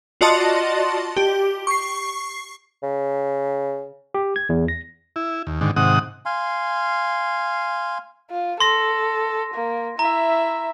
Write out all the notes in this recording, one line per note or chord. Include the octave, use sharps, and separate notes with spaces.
F4 F#4 D5 D#5 A5 C6
G4
C#6 C7
C#3
G4
G#6
E2
A#6
E4
D#2
G#2 D3 D#3
G#2 C3 D#3 F#5 D#6
F5 G#5 C6
F4
A4 C6 A#6
A#3
E4 E5 A#5